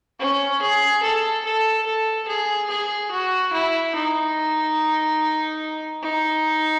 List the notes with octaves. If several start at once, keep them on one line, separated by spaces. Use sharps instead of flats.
C#4
G#4
A4
A4
A4
G#4
G#4
F#4
E4
D#4
D#4